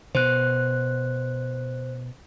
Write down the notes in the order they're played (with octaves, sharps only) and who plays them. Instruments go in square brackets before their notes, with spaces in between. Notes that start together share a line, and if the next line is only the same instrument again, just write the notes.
[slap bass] B2 [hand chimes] C5 F#6